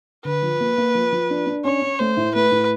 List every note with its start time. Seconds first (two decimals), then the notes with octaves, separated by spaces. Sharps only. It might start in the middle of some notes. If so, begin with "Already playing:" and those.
0.25 D3 B4
0.42 F3
0.60 A#3
0.78 A#3
0.95 F3
1.12 F3
1.30 D4
1.47 D4
1.64 C#4 C#5
1.82 C#4
1.99 A3 C5
2.17 A2
2.35 A3 B4
2.51 A2